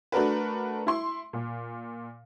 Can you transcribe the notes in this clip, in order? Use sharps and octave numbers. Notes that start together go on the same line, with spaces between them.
A3 D4 F#4 A#4 B4
E4 C6
A#2